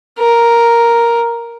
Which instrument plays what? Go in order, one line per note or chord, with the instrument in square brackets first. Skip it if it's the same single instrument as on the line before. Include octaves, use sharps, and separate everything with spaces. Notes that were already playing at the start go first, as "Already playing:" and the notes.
[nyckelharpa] A#4